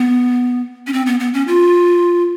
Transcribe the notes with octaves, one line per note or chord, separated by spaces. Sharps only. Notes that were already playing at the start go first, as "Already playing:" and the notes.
Already playing: B3
C#4
C4
B3
B3
C#4
F4